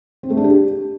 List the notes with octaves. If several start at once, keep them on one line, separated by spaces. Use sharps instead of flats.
C4
A3
D4
G4